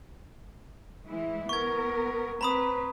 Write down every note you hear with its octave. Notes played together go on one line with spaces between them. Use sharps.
E3 G#3 E4
B3 A#4 C#6 G#6
C4 B4 A#5 B5 D#6